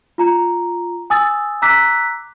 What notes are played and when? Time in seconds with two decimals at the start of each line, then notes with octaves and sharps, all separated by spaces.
0.18 F4 A#5
1.10 G#5 D#6 E6 A6
1.62 A#5 D6 E6 F#6 B6